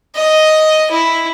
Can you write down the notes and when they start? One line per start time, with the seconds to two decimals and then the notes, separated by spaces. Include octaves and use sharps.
0.15 D#5
0.91 E4